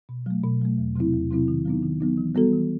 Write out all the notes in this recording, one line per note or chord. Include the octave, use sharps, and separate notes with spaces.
B2
F#3 A3
B2
F#3 A3
E2
C3 F#3 C4 E4
E2
C3 F#3 C4 E4
D#3
F#3 B3 D#4
D#3
F#3 B3 D#4
E3
G3 B3 F#4 A4
E3